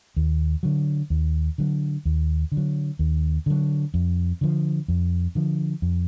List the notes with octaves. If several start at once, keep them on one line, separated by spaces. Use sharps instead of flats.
D#2
D3 F#3
D#2
D3 F#3
D#2
D3
F#3
D#2
D3 F#3
F2
D3 F3
F2
D3 F3
F2